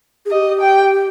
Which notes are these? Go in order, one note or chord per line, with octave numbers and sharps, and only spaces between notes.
G#4
G4 D#5
G5